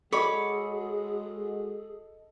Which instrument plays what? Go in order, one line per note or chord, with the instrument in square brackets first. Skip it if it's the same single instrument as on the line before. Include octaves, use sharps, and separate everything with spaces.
[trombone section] G#3 F#4 [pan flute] G#4 [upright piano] A4 D#5 [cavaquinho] C#5 B5 D6